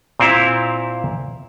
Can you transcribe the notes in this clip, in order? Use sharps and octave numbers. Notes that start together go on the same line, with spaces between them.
A#2 C4 E4 F5